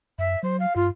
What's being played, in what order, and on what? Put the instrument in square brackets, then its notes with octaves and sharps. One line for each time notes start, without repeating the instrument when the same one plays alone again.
[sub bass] F#2 [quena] E5
[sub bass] F#3 [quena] C5
[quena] F5
[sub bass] G2 [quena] F4